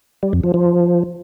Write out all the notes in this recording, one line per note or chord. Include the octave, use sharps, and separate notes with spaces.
G3
F2
F3
F3